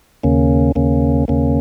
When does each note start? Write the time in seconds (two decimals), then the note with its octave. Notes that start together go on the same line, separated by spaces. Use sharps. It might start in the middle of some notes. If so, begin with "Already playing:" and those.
0.23 D#2 C#3 A#3 C#4
0.75 D#2 C#3 A#3 C#4
1.28 D#2 C#3 A#3 C#4